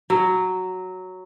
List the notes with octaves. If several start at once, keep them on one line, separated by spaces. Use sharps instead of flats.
F#3